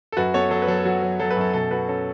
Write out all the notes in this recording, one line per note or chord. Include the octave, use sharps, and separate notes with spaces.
A4
F#2 F#4 B4
B3 A4 C#5
F#3 A4
B4
F#3 A4
A4
F#3 F#4
F#3
F#3 A4
B4
F#2 A4
B2 A4
B2 F#4 B4
C#4 A4